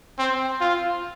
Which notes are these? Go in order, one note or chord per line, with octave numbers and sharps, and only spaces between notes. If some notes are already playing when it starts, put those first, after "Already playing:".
C4
F4